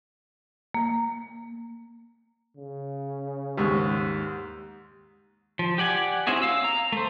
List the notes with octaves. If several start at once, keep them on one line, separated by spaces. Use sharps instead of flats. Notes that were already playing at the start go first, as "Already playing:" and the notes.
A#3
C#3
D#2 G#2 G4 C#6
F3
G4 D5 F#5 G#5
C4 C#4 E4 F#4 G#4
F5 E6
A#5
A3 C5